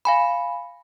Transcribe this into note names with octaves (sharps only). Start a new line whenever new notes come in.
F5 G#5 B5